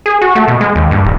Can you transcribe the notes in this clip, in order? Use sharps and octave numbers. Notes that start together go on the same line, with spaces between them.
G#4
F#4
A3
B2
G#3
D#2
G2
D#1